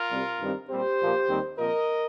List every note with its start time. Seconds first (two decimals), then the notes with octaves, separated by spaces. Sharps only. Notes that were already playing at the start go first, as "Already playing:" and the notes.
Already playing: F4 A#4
0.10 C2 C3 G3 C4
0.40 G2 D#3 G3 C4
0.69 A#2 G3 C4 G4 C5
1.00 A#2 F3 A#3
1.29 D#2 D#3 G3 C4
1.58 A#2 F3 C4 A#4 D#5